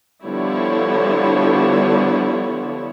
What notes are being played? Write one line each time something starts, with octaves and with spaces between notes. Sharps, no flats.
D3 F3 G3 B3 E4 C#5